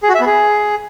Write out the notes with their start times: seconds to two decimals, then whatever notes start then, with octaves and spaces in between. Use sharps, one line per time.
0.03 G#4
0.09 F#4
0.15 E5
0.21 B3
0.26 G#4